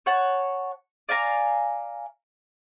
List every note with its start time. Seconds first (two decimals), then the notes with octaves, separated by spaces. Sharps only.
0.06 C#5 F#5 A5
1.09 D5 F5 G#5 A#5